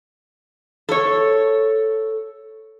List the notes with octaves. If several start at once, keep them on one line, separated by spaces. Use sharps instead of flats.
A4 C#5